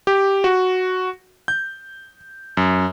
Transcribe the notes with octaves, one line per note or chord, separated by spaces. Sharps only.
G4
F#4
G6
F#2